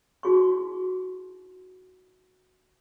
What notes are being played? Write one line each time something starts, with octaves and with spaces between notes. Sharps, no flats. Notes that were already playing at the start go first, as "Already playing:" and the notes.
D#4 E4 F#4 G#4 C6 C#6